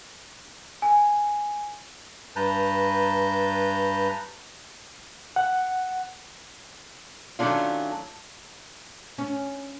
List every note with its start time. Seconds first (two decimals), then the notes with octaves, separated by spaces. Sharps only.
0.82 G#5
2.36 G2 B4 A5 A#5 G6
5.36 F#5
7.39 D#3 F#3 A3 C#4 D4 F4
9.18 C#4